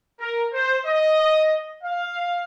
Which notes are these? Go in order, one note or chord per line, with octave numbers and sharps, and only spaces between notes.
A#4
C5
D#5
F5